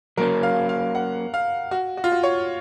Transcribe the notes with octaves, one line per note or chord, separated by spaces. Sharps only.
F#3 A#3 C#4 A#4
F5
F5
F#5
F5
F#4
F#4
F4
F#4
C#5